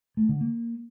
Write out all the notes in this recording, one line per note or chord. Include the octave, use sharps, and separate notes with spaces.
A3
D3
A#3